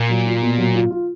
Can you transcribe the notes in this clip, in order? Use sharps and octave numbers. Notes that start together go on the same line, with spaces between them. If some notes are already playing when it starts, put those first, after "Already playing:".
Already playing: A#2
F#3
F4
B2
F#3
F4
F4